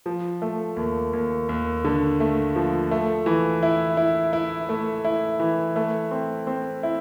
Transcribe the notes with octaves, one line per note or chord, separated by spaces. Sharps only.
F3
A3
D#2
D#2
D#2
D3
A3
F3
A3
E3
E4
E4
E4
A3
E4
E3
A3
C4
C4
E4